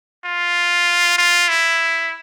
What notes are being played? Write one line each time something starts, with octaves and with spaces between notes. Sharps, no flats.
F4
F4
E4